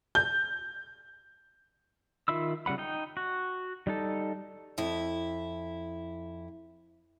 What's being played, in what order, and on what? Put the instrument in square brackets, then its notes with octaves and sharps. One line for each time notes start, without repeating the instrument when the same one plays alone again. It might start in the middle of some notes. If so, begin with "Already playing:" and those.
[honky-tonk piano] G6
[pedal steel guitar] D#3 F4 E5 B5 E6
C#3 G3 F#5 B5
D#4 G5
F#4
G3 D#4 A4
[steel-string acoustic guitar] F2 E4